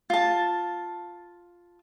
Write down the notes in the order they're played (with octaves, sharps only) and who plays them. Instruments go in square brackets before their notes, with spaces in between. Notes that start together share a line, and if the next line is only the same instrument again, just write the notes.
[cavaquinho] F4 A5